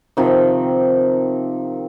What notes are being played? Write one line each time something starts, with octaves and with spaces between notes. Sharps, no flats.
C3 D#3 F3